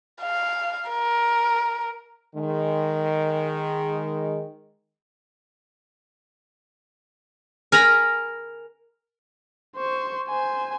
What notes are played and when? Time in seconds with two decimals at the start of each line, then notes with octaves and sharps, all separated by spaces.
0.22 F5
0.90 A#4
2.35 D#3 G#3
7.72 A#4 G#5 A#5 B5
9.76 C5 C#6
10.29 C5 G#5